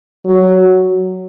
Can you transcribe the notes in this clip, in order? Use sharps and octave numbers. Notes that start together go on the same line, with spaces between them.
F#3